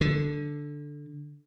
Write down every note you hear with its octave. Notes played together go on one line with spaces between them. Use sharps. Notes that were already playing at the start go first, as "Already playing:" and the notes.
D3